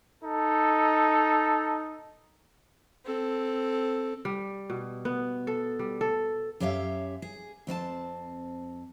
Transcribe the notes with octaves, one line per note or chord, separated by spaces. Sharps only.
D#4 A4
C4 A4
G3
B2
B3
A4
G3
A4
F#2 G4 C#5 E5 F5
G#4
F2 C4 F#4 A5